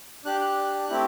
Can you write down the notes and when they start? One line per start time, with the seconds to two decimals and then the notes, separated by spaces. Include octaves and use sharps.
0.25 D4 G4 F#6
0.41 F#6
0.89 A3 C4 E4 G4